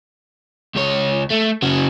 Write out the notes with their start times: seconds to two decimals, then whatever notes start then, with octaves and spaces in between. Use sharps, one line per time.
0.75 C#2 C#5
1.31 A3
1.62 C#3 F#4